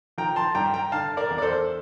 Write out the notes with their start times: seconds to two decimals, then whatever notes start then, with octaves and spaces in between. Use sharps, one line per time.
0.18 F3 G5 A#5
0.36 A5 C6
0.55 G2 G5 A#5
0.74 G5 A#5
0.92 D3 F5 A5
1.17 A#4 D5
1.30 E2
1.38 D5
1.42 A4 C5